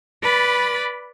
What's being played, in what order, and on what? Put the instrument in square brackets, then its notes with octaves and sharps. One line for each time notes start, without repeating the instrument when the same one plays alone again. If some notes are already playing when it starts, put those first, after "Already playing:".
[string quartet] B4 D5 B5 A6